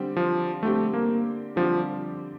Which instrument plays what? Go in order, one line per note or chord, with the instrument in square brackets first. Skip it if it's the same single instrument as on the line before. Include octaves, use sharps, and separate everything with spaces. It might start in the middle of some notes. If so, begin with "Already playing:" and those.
Already playing: [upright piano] D3 G3 C4 G4
[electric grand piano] F3
[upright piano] D3 G3 C4 G4 [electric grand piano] A3
[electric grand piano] A#3
[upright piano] D3 G3 C4 G4 [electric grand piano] F3